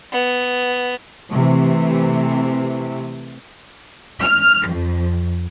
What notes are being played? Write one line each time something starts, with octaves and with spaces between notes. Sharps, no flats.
B3
C3 E3 A3
F6
F2